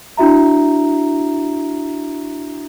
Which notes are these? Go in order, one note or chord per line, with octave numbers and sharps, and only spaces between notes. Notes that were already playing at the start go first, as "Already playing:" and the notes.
D4 E4 F#4 E5 A#5